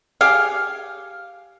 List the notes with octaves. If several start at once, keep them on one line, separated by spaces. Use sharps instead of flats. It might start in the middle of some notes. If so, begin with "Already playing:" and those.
G4 G#4 F5